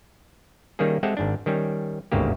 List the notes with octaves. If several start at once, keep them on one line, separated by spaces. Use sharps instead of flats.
D#3 G3 A#3 C#4 G#4
G#3 C4 G4 A4 E5 F#5
G#1 G#2 D4
D#3 G3 C#4
G1 D2 G#2 C#3 A#3 G4